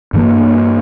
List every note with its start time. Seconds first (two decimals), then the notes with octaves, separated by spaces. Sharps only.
0.13 G2 E3 A#3